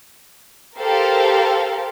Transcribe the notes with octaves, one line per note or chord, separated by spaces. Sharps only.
G4 A4 A#4 C5 F5